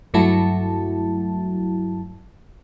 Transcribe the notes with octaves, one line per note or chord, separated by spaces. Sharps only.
G2 F#3 A3 E4 F#4 A5